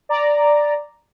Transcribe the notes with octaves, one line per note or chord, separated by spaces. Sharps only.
D5 A#5